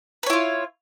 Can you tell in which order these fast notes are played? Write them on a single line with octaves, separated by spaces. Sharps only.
B4 C#5 E4 F4